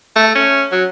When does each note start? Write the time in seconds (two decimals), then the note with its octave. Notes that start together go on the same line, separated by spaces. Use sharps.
0.16 A3
0.35 C#4
0.72 F#3